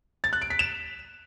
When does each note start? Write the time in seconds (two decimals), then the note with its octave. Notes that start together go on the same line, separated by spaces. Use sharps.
0.24 A6
0.33 F#6
0.42 D7
0.50 B6
0.59 E7